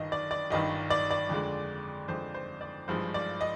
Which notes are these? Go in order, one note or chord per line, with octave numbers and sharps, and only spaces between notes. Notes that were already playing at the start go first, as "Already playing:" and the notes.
Already playing: G1 G2 D#3 D#5
D5
D5
G1 G2 D#3 D#5
D5
D5
F2 D3 G#3
F2 D3 G#3 C5
C5
D5
G#1 G2 F3 G#3 C5
D5
D#5